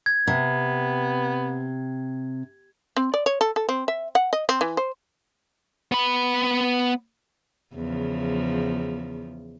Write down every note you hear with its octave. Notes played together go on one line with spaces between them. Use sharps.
G#6
C3 B3
C4
D5
C#5
A4
A4
C4
E5
F#5
D#5
C4
E3
C5
B3 B5
E2 C#3 F3